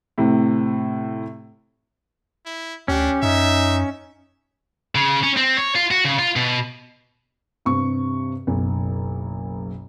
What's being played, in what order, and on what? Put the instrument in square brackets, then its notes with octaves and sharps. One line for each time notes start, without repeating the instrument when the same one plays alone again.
[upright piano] A2 C3
[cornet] E4
[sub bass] D2 [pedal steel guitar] C#4 [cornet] D4 [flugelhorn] G4
[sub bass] F#2 [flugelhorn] D#4 [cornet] E5
[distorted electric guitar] C#3
C#4
C4
C#5
F4
F#4
C#3
F4
B2
[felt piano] G2 C3 C#6
F#1 B1